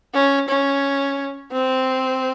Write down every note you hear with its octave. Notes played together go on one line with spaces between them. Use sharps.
C#4
C#4
C4